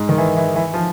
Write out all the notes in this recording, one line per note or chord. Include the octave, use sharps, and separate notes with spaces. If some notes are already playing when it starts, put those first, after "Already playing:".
Already playing: G#2
D#3
E3
E3
E3
F3